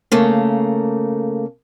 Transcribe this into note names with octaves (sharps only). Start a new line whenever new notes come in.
C#3 A3 A#3